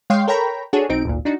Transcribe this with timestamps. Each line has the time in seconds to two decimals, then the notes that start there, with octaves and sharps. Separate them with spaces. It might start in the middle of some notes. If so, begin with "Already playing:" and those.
0.10 G#3 C#5 F5 G5 C6 C7
0.28 A4 A#4 C#5 G5 A#5 B5
0.73 D4 F#4 G#4 A4 C#5
0.89 B1 C4 D#4 D7
1.05 G#1 D2 A#2
1.25 D4 D#4 F#4